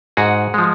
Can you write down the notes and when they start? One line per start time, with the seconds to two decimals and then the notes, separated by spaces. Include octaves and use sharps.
0.17 G#2 F#4 G#4
0.54 F3 G#3